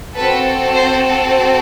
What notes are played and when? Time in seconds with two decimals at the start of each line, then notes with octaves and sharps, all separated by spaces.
0.16 C4 F#4 A4 B4
0.75 C5